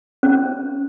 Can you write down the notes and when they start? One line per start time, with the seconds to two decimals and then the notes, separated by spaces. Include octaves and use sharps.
0.23 C#4